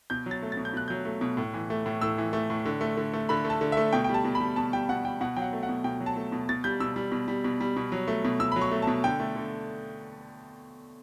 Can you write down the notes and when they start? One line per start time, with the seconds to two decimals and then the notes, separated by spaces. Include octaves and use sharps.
0.10 B2 G6
0.26 F#3
0.31 A6
0.42 A3
0.52 A6
0.57 B2
0.65 G6
0.74 B2 F#6
0.88 F#3 G6
1.05 A3
1.21 B2
1.37 A2
1.54 E3
1.70 A3
1.86 A2
2.01 A2 E6
2.18 E3
2.33 A3
2.50 A2
2.65 D3
2.81 A3
2.97 D3
3.13 A3
3.29 D3 B5
3.45 A3
3.50 A5
3.61 D3
3.72 A3 E5
3.93 B2 G5
4.04 G5
4.09 G3 A5
4.24 B2
4.35 B5
4.40 G3
4.56 B2 A5
4.73 G3 G5
4.89 B2 F#5
5.05 G3 G5
5.21 B2 F#5
5.36 F#3 G5
5.42 F#5
5.53 A3
5.63 F#5
5.69 B2
5.84 B2 G5
6.01 F#3
6.06 A5
6.16 A3
6.32 B2
6.49 B2 A6
6.64 G3 G6
6.80 B2 E6
6.96 G3
7.12 B2
7.28 G3
7.44 B2
7.61 G3
7.77 B2
7.92 F#3
8.08 A3
8.25 B2
8.40 B2 E6
8.52 F#3 B5
8.61 C#6
8.72 A3
8.82 B2 A5
9.04 D3 G5
9.20 A3
9.36 D3